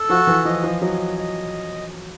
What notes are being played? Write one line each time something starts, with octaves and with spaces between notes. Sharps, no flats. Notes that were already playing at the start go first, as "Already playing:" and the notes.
Already playing: A4
F3 F#4
E3
F3 D#5
F3
F#3 D#5
D#5